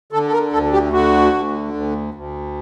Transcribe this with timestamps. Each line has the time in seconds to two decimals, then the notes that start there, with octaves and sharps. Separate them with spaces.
0.12 D3 A4
0.28 A4
0.33 A#4
0.53 D2 A4
0.73 G4
0.93 D3 F#4
1.34 D2
1.74 D2
2.14 D2